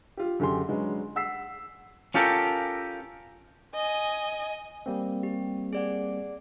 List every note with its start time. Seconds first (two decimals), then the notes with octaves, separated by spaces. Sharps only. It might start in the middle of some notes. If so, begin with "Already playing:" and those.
0.17 F4 G4
0.40 F#2 D3 G4 G#4 C6
0.69 F#3 G#3 C#4 D4 B4
1.16 F#5 E6 B6 C7
2.14 C#4 F4 G4 A4 A#4
3.75 D#5 G#5
4.86 G3 A#3 C4
5.23 G4
5.73 G#4 D5 F#5